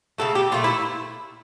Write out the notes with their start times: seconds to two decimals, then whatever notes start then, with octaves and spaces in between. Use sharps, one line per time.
0.18 C#3 E3 A3 A4
0.35 G4
0.52 A#2 A3 F4
0.64 E4